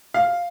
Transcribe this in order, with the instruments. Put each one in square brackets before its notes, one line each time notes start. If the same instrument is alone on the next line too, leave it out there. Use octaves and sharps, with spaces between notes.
[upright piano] F5